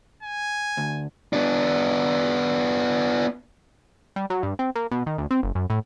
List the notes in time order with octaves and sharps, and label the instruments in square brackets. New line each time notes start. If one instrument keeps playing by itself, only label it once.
[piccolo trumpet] G#5
[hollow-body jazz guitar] D2
[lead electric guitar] B3 D4
[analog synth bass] G3
F#3
G2
C4
A#3
B2
D#3
D2
C4
F#1
F#2
A2